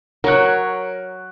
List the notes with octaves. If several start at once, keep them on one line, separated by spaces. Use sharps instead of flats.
F#3 A#4 C#5 F#6